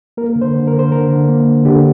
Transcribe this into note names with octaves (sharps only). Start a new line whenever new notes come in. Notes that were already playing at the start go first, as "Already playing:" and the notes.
A#3 A#4
D3
C5
D3
A#4
D3
C5
D3 A#4
D3
A#3
D3
D3 G4